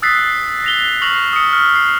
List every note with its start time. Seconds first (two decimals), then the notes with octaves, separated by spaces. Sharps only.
0.02 D#6 E6 F#6 A6 B6 C7
0.64 A#6 F7 G7
1.02 C#6 F6 A#6 C7 F7 F#7
1.33 D#6 C#7
1.53 F6
1.75 C7